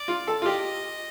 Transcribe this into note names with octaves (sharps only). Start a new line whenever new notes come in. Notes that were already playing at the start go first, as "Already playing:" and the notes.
Already playing: D5
F4
A4
F4
G4 D#5